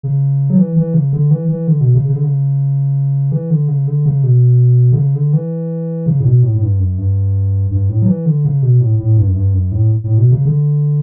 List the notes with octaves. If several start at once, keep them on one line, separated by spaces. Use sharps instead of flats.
C#3
F#3
E3
E3
C#3
D3
E3
E3
D3
B2
C#3
C#3
D3
C#3
E3
D3
C#3
D3
C#3
B2
D3
C#3
D3
E3
C#3
A2
B2
A2
A2
G2
F#2
G2
G2
A2
F#3
E3
D3
C#3
B2
A2
A2
G2
F#2
G2
F#2
A2
A2
B2
C#3
D3